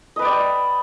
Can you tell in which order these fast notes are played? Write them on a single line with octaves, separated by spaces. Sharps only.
D#5 B4 G5 D5